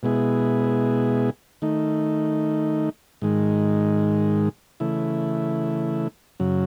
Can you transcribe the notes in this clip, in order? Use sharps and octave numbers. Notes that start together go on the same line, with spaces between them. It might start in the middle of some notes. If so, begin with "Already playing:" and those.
B2 G#3 B3 E4 G#4
D#3 A3 D#4
G#2 D#3 G#3
C#3 E3 A3 E4
F#2 C#3 F#3